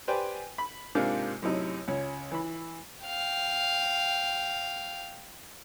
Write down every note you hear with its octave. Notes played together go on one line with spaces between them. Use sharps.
G4 B4 C5 D5 G5 G#5
B5
G#2 C3 A#3 D4 F4
F#2 A2 C3 D#4
C#2 C#4
E3 B5
F5 G5